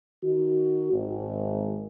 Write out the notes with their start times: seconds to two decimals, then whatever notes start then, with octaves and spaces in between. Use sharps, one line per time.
0.23 D#3 D#4 F#4
0.92 G#1